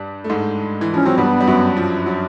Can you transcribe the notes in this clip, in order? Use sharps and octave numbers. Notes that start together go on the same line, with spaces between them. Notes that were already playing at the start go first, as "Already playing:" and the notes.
Already playing: G2 G3
A3
G#2 G#3
E3
F3 C#4
F#3 C4
G2 G3 B3
G3
F#2 F#3
F3
F#3